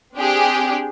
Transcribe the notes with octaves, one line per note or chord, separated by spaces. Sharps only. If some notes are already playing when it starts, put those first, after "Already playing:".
C4 D4 G4 G#4